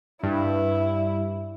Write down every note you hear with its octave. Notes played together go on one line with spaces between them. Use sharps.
G2 E4